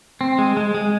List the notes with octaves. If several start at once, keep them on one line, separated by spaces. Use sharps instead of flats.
C4
G#3
G#3
G#3